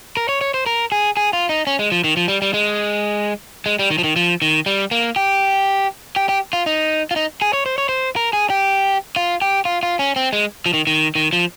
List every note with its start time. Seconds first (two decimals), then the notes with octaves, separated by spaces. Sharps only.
0.17 A#4
0.29 C#5
0.41 C#5
0.54 C5
0.66 A#4
0.92 G#4
1.17 G#4
1.33 F4
1.49 D#4
1.67 C#4
1.79 G#3
1.92 F3
2.04 D#3
2.17 F3
2.28 G3
2.42 G3
2.54 G#3
3.66 G#3
3.79 G3
3.90 D#3
3.98 F3
4.04 D#3
4.16 F3
4.42 D#3
4.66 G3
4.91 A#3
5.16 G4
6.16 G4
6.29 G4
6.53 F4
6.66 D#4
7.11 F4
7.16 D#4
7.42 G#4
7.53 C#5
7.66 C5
7.78 C#5
7.89 C5
8.16 A#4
8.33 G#4
8.50 G4
9.16 F4
9.42 G4
9.65 F4
9.83 F4
9.99 C#4
10.16 C4
10.33 G#3
10.66 F3
10.74 D#3
10.87 D#3
11.15 D#3
11.33 F3